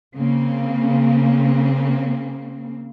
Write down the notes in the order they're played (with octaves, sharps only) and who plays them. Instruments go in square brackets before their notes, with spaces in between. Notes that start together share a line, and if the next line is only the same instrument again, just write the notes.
[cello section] C#3 A#3 C4